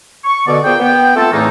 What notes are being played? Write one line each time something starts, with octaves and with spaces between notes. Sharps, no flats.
C#6
B2 D3 B3 D5
A#2 B3 G#4 C5 G5
B3 G5
A3 C4 F4 A4
E2 A2 E3 A3 A#3 D#4